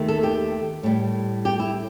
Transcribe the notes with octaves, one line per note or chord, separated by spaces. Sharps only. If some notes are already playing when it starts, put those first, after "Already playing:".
Already playing: D#2 D#3 A3
A4
G4
A2 G3
G4
E4